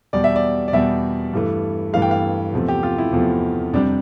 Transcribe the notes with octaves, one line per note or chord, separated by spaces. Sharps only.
E2 B2 G3 D5
E5
D5
D5
E2 B2 G3 E5
G2 E3 A3
G2 E3 A3 F5
G5
F5
E2 C3 F3 A3
G4
F4
E4
E2 C3 F3 A3
F2 C3 G3 D4